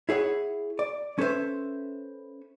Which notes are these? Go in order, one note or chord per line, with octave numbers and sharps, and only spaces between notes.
E4 G#4 C#5 F#5
D5
C#4 A4 B4 C5 E5